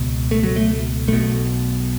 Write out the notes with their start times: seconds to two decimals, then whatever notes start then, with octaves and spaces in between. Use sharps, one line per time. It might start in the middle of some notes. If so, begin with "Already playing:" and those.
Already playing: C#2 B2
0.31 A3
0.43 F#3
0.56 A3
1.08 B1 B2 A3